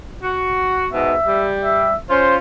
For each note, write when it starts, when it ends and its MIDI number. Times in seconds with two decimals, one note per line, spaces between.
0.23 0.88 66
0.93 1.15 44
0.93 1.15 47
0.93 1.49 76
1.26 1.93 55
1.64 1.96 76
2.10 2.38 61
2.10 2.38 65
2.10 2.36 72